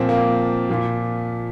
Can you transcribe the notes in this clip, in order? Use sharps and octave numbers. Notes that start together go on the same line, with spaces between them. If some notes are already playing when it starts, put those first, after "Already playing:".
Already playing: A#2 F3 C4
A#3
A#2 F3